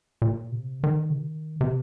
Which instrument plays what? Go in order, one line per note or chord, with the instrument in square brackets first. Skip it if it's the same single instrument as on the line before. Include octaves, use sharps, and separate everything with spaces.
[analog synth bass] A#2
C3
D#3
C3
D#3
C3